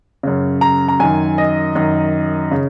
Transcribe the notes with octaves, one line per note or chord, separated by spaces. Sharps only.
F#2 C#3
A#5
A#5
F#2 D#3 G#5
D#5
F#2 D#3
C#3